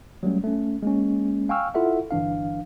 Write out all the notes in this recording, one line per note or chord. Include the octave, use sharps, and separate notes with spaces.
F#3 G3 A3 C#4
A3 C#4
G#3 A#3 C#4
F5 G5 G#5 C#6 E6 F6
E4 F4 A4 E5 F#5
G1 E3 D4 F5